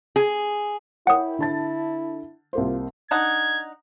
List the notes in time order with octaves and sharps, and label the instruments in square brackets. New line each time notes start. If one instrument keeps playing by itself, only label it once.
[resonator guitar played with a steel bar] G#4
[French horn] E4 [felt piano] A#4 C#5 G5 [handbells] F#5 D#6
[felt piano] D3 A5 A6
[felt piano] C2 A#3 C5 [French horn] F4
[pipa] D4 D#4 F#5 [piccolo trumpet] G#6